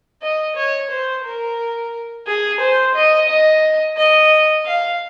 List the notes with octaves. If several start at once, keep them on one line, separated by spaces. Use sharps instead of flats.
D#5
C#5
C5
A#4
G#4
C5
D#5
D#5
D#5
F5